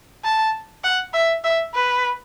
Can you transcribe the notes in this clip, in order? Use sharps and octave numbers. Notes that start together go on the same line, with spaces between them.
A5
F#5
E5
E5
B4